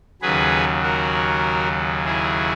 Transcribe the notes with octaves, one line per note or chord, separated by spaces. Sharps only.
D#2 C#3 F#3 G#4 B4
F#4 A#4
E4 G#4